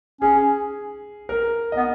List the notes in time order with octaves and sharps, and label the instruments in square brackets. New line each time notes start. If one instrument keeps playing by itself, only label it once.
[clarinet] C#4 [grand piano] G#4
[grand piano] A#4
[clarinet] B3 [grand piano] D#5